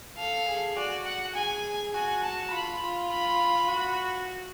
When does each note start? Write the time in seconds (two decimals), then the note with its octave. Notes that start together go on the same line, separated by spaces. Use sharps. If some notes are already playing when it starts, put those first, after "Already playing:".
0.18 A4 F5
0.48 G#4
0.77 F#4 D5
1.06 F#5
1.35 G#4 G#5
1.93 F#4 G#5
2.23 A5
2.52 F4 B5
2.81 F4
3.11 B5
3.68 F#4